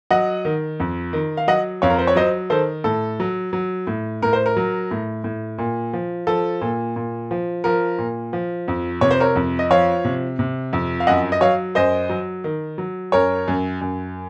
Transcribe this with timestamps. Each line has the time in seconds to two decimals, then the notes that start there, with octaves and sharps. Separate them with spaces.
0.11 F#3 D#5 F#5
0.45 D#3
0.80 F2
1.13 D#3
1.37 F5
1.48 F#3 D#5 F#5
1.82 F2 C#5 F5
1.90 A#4
1.99 C5
2.07 C#5
2.16 F#3 C5 D#5
2.50 D#3 A4 C5
2.84 A2 A4
3.20 F#3
3.53 F#3
3.87 A2
4.22 A2 A#4
4.33 C5
4.46 A#4
4.57 F#3
4.91 A2
5.24 A2
5.58 A#2
5.93 F3
6.27 F3 A4
6.61 A#2
6.96 A#2
7.31 F3
7.64 F3 A#4
7.98 A#2
8.33 F3
8.68 F2
9.01 C3 C#5
9.11 C5
9.20 A#4 C#5
9.36 F2
9.59 D#5
9.71 F3 C#5 F5
10.05 C3
10.39 C3
10.73 F2
11.00 F5
11.07 F#2 D#5 F#5
11.32 D#5
11.41 F#3 C#5 F5
11.75 F#2 C5 D#5
12.09 F#3
12.44 D#3
12.78 F#3
13.12 F#2 A#4 C#5
13.48 F#2
13.81 F#2